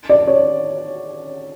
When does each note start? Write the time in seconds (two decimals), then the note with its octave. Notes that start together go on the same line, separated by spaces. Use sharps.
0.09 D5
0.28 C#5